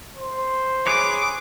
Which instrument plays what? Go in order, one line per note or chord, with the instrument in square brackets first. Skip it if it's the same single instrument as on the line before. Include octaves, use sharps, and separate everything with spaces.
[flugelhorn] C5
[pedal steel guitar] G#4 B4 C#5 [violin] D6